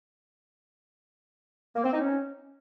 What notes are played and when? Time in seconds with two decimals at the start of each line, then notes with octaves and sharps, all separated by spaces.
1.76 A#3
1.84 C4
1.92 D#4
2.00 C#4